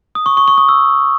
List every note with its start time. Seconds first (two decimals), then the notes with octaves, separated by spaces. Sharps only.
0.15 D#6
0.26 C#6
0.37 C#6
0.48 C#6
0.58 D#6
0.69 E6